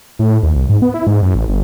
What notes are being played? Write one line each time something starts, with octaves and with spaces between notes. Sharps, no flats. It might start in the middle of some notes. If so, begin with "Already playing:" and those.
A2
D#2
C2
G#2
B3
E4
G#2
F#2
A1
G1